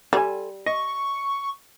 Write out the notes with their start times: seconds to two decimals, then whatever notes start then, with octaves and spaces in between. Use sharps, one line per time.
0.13 G3 A4 C5 G#5
0.66 D#5 C#6